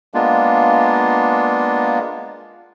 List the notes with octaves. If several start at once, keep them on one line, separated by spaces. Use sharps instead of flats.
G#3 A#3 B3 D4 F4